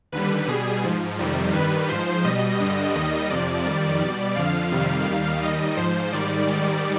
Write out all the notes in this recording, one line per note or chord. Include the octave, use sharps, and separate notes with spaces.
D#2 D3 G3 B4
B2 G3 G#4
G#2 F3
F2 C3 D#3 G3
G2 D#3 G3 B4
G#2 F3 C5
B2 G3 D#5
G2 D3 G3
D#2 D#3 G3 D#5
F2 C3 F3 D5
F2 D#3 G3
B2 G3
F2 D3 F3 F5
F2 C3 D#3 G3
D#2 D#3 G3
D#2 D#3 G3 D#5
G#2 F3 C5
G#2 D#3 G3 D5
G#2 D#3 G3 D5